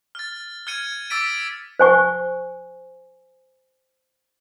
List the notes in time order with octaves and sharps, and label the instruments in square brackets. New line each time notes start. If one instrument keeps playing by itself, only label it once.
[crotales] F6 A6
F6 G#6 C#7 D#7
D6 E6 A6 B6 D7 D#7
[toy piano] C5 G#5 C#6